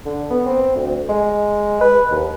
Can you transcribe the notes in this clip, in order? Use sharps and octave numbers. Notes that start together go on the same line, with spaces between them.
D3
B3
C4
D2
G#3
B4
D#2